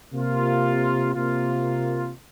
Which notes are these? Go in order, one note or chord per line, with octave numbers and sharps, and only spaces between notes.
C3 A#3 F4
C3 A#3 F4